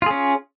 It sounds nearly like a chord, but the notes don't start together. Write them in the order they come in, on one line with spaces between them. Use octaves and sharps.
F4 G#4 C#4